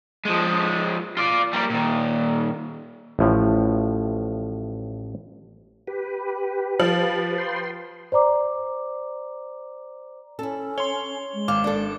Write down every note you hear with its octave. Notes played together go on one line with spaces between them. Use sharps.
F3 G#3
F4 D5
G3 A#3
A#2 D#3
A1 A2 F3
G4 B4
F3
B4 G5 C6
C5 D5 A#5 D6
C#4 E4 A4
C#5 C6 G7
G#3
G#1 F5 D6 G7
D4 A4